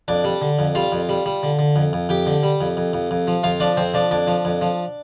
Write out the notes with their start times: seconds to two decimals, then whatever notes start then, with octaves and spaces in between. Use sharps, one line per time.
0.08 F2 D4 D5
0.25 G3
0.42 D3
0.59 F2
0.75 G3 F4 F5
0.92 F2
1.09 G3
1.26 G3
1.43 D3
1.59 D3
1.76 F2
1.93 F2
2.09 F2 G4 G5
2.27 D3
2.43 G3
2.61 F2
2.77 F2
2.93 F2
3.11 F2
3.27 F3
3.43 F2 F4 F5
3.60 F3 D4 D5
3.77 F2 C4 C5
3.94 F3 D4 D5
4.11 F2 D4 D5
4.27 F3
4.45 F2
4.61 F3